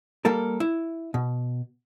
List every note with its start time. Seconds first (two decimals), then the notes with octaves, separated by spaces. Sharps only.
0.25 G3 A#3 A4 A#4
0.60 E4
1.14 B2